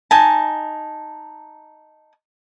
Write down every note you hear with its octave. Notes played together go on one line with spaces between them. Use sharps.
D#4 G#5 A5